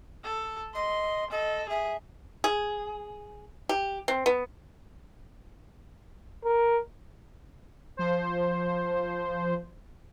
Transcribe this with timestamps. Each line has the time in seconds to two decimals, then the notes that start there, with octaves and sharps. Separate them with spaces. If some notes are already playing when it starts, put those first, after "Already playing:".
0.24 A4
0.74 D#5 C6
1.31 A4 D#5
1.69 G#4 E5
2.44 G#4
3.69 G4
4.08 C4
4.26 B3
6.45 A#4
7.97 F3 C5